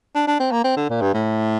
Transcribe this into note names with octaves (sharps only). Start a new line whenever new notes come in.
D4
D4
C4
A#3
C4
D3
A#2
G2
A2